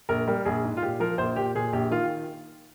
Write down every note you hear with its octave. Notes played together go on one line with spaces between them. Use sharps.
A#1 A#4
G3 A#4
A#1 G#4
G#2
F4
A#2 G4
F3 A#4
A#1 C5
A#2 G4
A#2 G#4
A#1 G4
D#3 F4